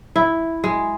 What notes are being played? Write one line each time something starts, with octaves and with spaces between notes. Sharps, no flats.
E4
G#3